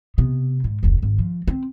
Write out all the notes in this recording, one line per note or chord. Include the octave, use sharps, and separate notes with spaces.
C3 B3
G#2
F1 D2
G#1
F3
C4